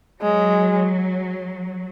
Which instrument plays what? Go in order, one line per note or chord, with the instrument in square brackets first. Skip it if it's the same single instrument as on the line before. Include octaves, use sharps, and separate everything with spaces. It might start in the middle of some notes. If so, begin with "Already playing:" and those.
[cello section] F#3 [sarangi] G#3